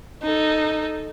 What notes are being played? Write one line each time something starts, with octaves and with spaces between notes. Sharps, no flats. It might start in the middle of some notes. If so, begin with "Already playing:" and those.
D#4 A4